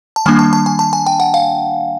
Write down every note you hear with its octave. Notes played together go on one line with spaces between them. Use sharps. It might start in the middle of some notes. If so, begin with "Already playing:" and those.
A5
D#3 G3 A#3 D4 G#5
A5
A5
G#5
A5
G#5
G5
F#5
F5